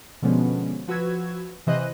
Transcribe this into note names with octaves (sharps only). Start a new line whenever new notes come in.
B2 D3 F3 G#3 B3 C#4
F3 F#4 B4 E6 G#6
C3 E3 C5 D#5 F#6 D#7